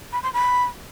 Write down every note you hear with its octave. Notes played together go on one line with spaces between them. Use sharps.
B5
C6
B5